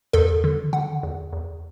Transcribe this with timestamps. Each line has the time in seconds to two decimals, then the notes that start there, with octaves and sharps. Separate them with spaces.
0.13 E2 A4
0.44 D3
0.73 D3 F#5
1.03 E2
1.33 E2